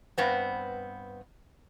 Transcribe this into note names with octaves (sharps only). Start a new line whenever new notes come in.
G2 B3 C4